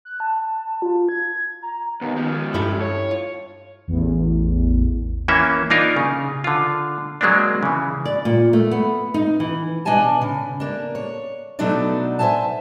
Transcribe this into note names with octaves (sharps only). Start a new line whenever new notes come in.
F#6
A5
F4
G#6
A#5
D#2 D#3 B3
G#2 F3
G2 E4 G4 A4
C#5
F4
A1 E2
E3 A#3 C#4 E5
A#3 D4 D#4 F4 A#4
C#3
D3 F4
F#3 G#3 A#3 C4 D4
C#3 E3
D5
A#2
A3
B3
D#4
E3
B2 D4 D#5 F5 G#5 A5
C#3
A#3 D4
C#5
B2 F#3 A3 D4 D#4 D5
C5 D#5 E5 G#5 A5